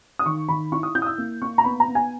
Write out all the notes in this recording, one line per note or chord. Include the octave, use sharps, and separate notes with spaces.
D#6
D#3 C#6
D#3 B5
E4 C#6
D#6
E4 G6
D#6
E6
A#3
A#3 C#6
A#5
B3 B5
A#5
B3
G#5